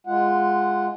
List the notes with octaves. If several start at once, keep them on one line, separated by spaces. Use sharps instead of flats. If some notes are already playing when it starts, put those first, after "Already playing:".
G#3 F4 F#5